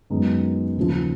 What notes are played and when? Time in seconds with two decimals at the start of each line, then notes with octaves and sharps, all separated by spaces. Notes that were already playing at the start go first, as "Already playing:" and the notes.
0.10 F#2 D#3 G#3 B3 D#4
0.77 D#2 C#3 F3